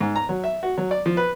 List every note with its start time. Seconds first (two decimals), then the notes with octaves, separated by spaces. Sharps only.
0.01 G#2
0.16 A#5
0.29 F#3
0.44 E5
0.63 F#4
0.78 F#3
0.91 D5
1.06 F3
1.17 B4